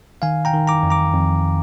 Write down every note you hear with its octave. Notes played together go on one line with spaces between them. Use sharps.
D#3 F5 G#5
G5 A#5
D#3
A#5 D6
F2
A#5 D6
F2